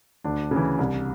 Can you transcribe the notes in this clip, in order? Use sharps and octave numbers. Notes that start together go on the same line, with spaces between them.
D2 D4
C#3
E3
C2